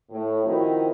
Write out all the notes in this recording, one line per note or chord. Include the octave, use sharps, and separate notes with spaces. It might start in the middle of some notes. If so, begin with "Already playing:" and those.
A2
D#3 F3 C4 D#4 E4 F#4